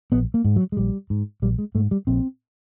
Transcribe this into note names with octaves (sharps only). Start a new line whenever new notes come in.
A#1 B3
A#3
G#2
F#3
G#3
A#1 G3
G#2
A#1 G3
G#3
G#2 A3
G3
A#1 C4